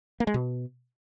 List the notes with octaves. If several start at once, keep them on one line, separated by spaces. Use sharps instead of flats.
A#3
G#3
B2